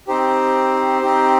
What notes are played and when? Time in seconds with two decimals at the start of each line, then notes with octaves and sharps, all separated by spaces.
0.08 C4 D#4 G4 C5
1.02 C4 D#4 G4